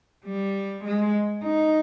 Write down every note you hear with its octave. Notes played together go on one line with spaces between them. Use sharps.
G3
G#3
D#4